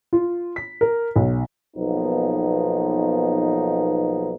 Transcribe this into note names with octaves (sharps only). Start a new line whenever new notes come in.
F4
B6
A#4
B1
B1 F3 A#3 B3 D#4